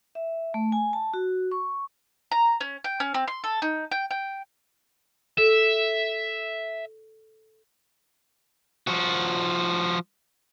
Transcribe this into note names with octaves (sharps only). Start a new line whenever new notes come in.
E5
A3
G#5
A5
F#4
C#6
A#5
C#4
G5
C#4
C4
C6
A4
D#4
G5
G5
A4 E5
F3 F#4